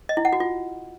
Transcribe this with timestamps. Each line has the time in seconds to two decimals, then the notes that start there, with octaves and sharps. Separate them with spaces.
0.09 D#5
0.17 E4
0.25 F#5
0.33 F#4
0.40 F4